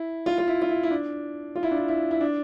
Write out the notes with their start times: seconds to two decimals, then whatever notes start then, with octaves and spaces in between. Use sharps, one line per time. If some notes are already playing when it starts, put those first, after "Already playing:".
Already playing: E4
0.26 F4
0.38 F4
0.48 E4
0.62 F4
0.69 E4
0.83 E4
0.91 D4
1.56 F4
1.63 E4
1.71 D4
1.78 E4
1.88 E4
2.11 E4
2.21 D4